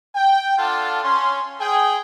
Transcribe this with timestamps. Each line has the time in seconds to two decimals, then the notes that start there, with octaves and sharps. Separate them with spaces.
0.16 G5
0.58 D4 F4 A4 F5 F#5 A5
1.03 C#4 C6
1.60 G#4 G5